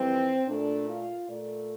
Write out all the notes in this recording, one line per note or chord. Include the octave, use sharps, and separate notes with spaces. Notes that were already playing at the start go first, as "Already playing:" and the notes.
Already playing: F2 E3 G3 C4
A#2 A3 D4
F4
A#2 A3 D5